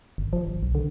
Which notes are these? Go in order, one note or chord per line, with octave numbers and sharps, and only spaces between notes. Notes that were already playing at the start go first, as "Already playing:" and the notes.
G1
F3
G#1
B1
D3